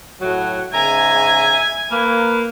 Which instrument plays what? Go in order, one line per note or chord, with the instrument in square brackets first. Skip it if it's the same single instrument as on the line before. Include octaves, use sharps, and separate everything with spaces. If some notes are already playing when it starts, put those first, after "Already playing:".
[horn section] A2 F#3 [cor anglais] F#4
[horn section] G#2 C#3 A#5 [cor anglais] E5 [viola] G#5
[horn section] A#3 [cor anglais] B4